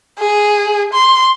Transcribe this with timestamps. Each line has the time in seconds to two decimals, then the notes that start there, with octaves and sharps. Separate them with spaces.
0.19 G#4
0.93 C6